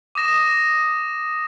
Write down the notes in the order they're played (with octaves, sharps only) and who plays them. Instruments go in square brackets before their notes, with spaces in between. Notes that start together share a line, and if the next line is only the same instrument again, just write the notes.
[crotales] D6 D#6 A#6 E7